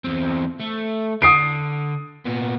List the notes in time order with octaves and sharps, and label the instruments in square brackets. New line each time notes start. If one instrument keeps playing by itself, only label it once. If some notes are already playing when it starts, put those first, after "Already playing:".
[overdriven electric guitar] E2 C4
A3
[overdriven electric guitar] D3 [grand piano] D#6 C7 D7
[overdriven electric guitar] A#2 B3